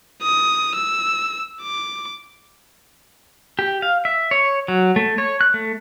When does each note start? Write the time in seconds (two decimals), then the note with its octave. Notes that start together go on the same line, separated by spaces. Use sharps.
0.23 D#6
0.75 E6
1.62 D6
3.59 G4
3.82 F5
4.05 E5
4.31 C#5
4.68 F#3
4.96 A3
5.18 C#5
5.41 F#6
5.54 A3